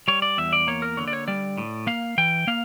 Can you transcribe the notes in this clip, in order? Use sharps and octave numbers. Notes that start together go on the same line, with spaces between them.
G3 C#5
D5
E2 E5
D5
A#3 C#5
A#4
D3 C#5
D5
C#5
G3 D5
A2
A#3 F5
E3 G5
A#3 F5